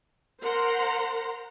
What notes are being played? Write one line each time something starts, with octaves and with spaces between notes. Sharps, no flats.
A#4 C5 F#5 A#5 C6